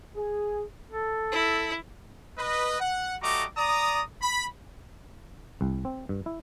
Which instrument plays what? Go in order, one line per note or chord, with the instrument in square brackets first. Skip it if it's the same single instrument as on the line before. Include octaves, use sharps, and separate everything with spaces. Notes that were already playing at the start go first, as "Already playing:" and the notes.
[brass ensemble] G#4
[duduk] A4
[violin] E4
[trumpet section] B4 D#5
F#5
G3 A3 F#4 D#5 A#5 D6
D5 A#5 D#6
B5
[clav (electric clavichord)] C2
C4
G2
E4